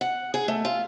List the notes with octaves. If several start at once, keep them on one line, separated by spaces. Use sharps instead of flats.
F#5
G#4
A3
F4